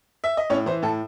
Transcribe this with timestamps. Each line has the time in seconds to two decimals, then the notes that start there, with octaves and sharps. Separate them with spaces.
0.24 E5
0.37 D#5
0.50 A2 C#4 C#5
0.66 E3 C5
0.82 A2 A4